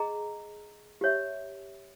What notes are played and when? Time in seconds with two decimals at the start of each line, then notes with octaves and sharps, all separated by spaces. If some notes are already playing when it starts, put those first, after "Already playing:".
Already playing: G#4 D#5 A#5
1.01 G4 C#5 E5